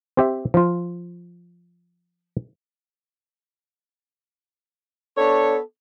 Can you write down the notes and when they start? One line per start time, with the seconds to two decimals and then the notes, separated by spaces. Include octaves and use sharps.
0.17 C4 G4 E5
0.54 F3 F4
5.17 B3 D4 A4 C#5